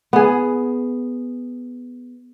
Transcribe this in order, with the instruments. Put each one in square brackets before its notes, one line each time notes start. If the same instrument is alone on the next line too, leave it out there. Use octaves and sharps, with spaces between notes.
[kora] B3 G#4